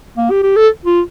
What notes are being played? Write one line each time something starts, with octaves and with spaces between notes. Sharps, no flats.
A#3
G4
G4
A4
F4